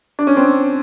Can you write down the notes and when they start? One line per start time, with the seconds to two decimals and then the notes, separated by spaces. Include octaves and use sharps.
0.19 D4
0.27 C#4
0.37 C4 D4